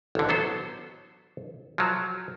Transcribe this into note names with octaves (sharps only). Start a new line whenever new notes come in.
A1 D3
F#3 B3 A4 C5
F3 F#3